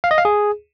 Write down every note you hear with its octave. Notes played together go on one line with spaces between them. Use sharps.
F5
D#5
F5
G#4